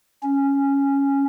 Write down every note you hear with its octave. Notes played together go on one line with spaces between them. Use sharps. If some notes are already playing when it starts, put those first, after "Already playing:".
C#4